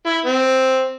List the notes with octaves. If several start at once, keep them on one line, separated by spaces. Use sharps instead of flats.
E4
C4